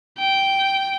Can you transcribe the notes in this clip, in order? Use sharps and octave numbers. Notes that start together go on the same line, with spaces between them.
G5